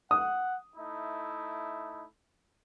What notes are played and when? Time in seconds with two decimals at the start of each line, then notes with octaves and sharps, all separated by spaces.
0.11 F#5 D#6
0.76 A3 D#4 E4